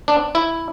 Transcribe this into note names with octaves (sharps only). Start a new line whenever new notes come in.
D4
E4